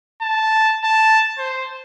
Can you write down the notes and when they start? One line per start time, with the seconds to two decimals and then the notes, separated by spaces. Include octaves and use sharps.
0.22 A5
0.84 A5
1.39 C5